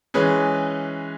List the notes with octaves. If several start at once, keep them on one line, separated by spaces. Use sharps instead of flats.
E3 G#3 C#4 G#4 B4